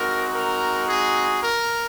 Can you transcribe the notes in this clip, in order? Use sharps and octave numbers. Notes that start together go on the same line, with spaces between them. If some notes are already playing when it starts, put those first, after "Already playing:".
Already playing: G#3 C4 D#4 F#4 A#4
A#4
G#4
A#4